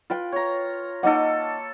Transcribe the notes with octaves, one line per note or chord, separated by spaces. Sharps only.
F4 B4 G5
C#5 A#5
A#3 D#4 A4 D#5 F#5